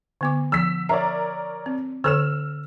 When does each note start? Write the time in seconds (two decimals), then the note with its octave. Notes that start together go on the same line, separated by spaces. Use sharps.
0.21 D3 B3 D6
0.52 F3 E6 B6
0.89 A#4 C#5 D5 E5
1.66 C4
2.04 D3 A4 C#5 E6 F6 E7